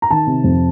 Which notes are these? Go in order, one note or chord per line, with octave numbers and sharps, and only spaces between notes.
A#5
D#3 A5
C3
F2